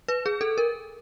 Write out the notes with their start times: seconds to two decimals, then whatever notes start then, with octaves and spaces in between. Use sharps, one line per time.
0.08 B4
0.26 G#4
0.41 A4
0.58 A#4